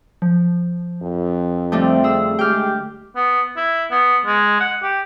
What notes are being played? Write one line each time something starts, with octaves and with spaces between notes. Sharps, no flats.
F3
F2
D3 F3 G3 A3 C4
G#4 E6
G#3 G4 G5 F6
B3
E4
B3
G#3
F#5
G4